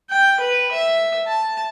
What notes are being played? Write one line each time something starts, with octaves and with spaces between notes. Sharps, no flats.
G5
B4
E5
A5